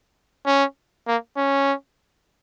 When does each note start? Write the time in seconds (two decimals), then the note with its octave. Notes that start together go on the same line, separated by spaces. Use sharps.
0.46 C#4
1.07 A#3
1.37 C#4